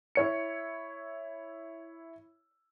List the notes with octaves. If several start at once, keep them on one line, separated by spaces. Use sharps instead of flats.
E4 C#5 C#7